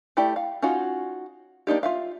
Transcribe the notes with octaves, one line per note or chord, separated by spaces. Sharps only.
A3 E4 G4 D5
F5
C#4 D#4 F4 F#4
A#3 D4 D#4 G4
F4 E5 F5